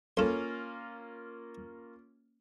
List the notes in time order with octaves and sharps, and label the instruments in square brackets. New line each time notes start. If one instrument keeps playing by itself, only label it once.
[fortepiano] A#3 C#4 F4 [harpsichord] A4 C6